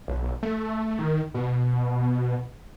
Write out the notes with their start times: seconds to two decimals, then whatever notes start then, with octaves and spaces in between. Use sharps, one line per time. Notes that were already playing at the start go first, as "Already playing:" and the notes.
0.08 B1
0.43 A3
0.99 D#3
1.34 B2